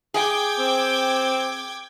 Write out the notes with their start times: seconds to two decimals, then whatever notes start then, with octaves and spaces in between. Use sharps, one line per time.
0.14 G#4 G5 D6 G#6
0.59 C4